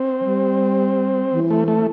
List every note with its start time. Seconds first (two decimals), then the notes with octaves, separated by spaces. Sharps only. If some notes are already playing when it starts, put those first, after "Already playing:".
Already playing: C4
0.21 F3
0.25 G3
1.32 E3
1.50 A3
1.68 A3